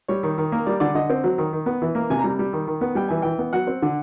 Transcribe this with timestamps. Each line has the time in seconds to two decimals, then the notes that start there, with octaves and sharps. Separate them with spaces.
0.08 G3 C#5
0.23 D#3
0.38 D#3
0.52 A#3
0.66 G3 D5
0.80 D3 D5
0.95 D3 D#5
1.10 C4
1.24 F#3
1.38 D#3
1.53 D#3
1.66 B3
1.82 E3
1.95 A#3
2.10 C3 G#5
2.19 A#5
2.24 G3
2.39 G3
2.53 D#3
2.67 D#3
2.81 B3
2.95 G3 G5
3.08 E3 G#5
3.22 E3 G5
3.39 B3
3.53 F#3 F#5
3.67 C4
3.82 D3